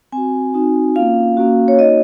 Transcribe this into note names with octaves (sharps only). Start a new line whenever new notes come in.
C4 F#4 G#5
C4 D#4 F#4
A#3 C#4 F4 F5
A#3 C#4 F#4
C#5
A#3 D#4 F#4 D#5